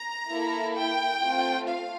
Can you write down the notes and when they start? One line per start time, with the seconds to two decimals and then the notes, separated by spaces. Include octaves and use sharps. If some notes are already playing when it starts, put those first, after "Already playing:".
Already playing: A#5
0.30 A#3 E4 A4
0.76 G5
1.22 A3 C4 F4
1.68 F5